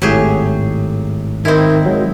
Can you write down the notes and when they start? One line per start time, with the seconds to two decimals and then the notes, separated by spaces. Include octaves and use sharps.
0.02 G#1 A2 F#3 G4 G#4
1.45 D#3 C4 E4
1.86 F#3 G#3